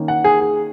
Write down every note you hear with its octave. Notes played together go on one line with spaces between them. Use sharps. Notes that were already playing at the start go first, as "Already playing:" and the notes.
Already playing: D#3 A#3 C#4
F#5
G#4
G#4